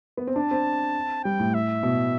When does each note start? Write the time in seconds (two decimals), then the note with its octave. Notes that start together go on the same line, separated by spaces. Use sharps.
0.17 B3
0.27 C4
0.36 D4 A5
0.51 C4
1.24 G3 G5
1.40 A2
1.54 E5
1.83 B2